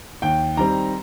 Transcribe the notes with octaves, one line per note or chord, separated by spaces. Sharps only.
D#2 G5
D#3 G3 C4 A#5